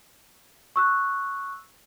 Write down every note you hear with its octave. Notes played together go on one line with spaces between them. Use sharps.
C#6 E6 F#6